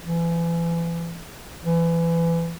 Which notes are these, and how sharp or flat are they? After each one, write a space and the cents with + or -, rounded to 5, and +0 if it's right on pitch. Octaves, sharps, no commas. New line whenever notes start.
E3 +35
E3 +25